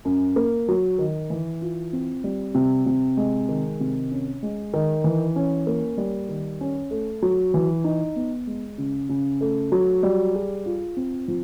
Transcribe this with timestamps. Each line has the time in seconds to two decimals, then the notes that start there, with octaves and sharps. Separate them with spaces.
0.05 F#2
0.36 A#3
0.68 F#3
0.99 D#3
1.30 E3
1.62 F4
1.93 C4
2.24 G3
2.55 C3
2.86 C3
3.17 G#3
3.49 D#3
3.80 C3
4.11 C#4
4.43 G#3
4.74 D#3
5.04 E3
5.36 C#4
5.67 A#3
5.98 G3
6.29 D#3
6.61 C#4
6.91 A3
7.22 F#3
7.54 E3
7.84 D#4
8.16 B3
8.47 G#3
8.78 C#3
9.09 C#3
9.41 A3
9.72 F#3
10.03 G3
10.35 G#4
10.66 F4
10.97 C4
11.28 F3